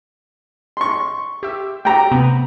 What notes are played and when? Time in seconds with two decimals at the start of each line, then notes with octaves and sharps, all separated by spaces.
0.77 C6 C#6
1.43 G4 E5
1.85 A3 F#4 G4 G5 A#5
2.11 C3 B3